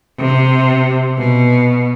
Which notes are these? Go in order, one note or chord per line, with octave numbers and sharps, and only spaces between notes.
C3
B2